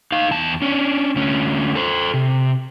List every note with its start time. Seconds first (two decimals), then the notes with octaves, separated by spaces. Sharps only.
0.12 D#4 F5
0.31 E2 A5
0.62 C#4 D4
1.16 D2 C#4
1.75 A4 C5
2.14 C3